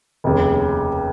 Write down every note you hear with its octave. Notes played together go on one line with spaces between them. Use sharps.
F1 D#2 C#3